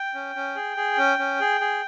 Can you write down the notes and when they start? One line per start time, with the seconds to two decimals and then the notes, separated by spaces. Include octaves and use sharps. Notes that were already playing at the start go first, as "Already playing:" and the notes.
Already playing: G5
0.14 C#4
0.35 C#4
0.56 G#4
0.77 G#4
0.98 C#4
1.19 C#4
1.40 G#4
1.61 G#4